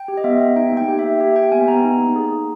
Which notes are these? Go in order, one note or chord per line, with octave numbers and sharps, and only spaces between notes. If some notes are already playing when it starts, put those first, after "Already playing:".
Already playing: G5
G4
D#5
B3 E5
B3
D#4 G5
A#3 G5
G4
E5
A#3
G4 E5
G4 G5
B3 G#5
B3 A#5
D#4
A#3
G#4
A#3